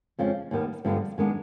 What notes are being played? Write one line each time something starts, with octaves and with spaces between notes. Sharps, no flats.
F2 C#3 F3 G#3
D#2 D#3 G3 B3
G2 D3 F3 G#3 B3
F#2 D#3 G#3 B3 D4